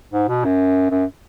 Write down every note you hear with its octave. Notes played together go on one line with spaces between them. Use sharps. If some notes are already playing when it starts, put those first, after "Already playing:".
G#2
B2
F#2
F#2